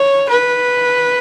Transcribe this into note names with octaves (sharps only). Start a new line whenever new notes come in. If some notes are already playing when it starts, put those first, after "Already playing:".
Already playing: C#5
B4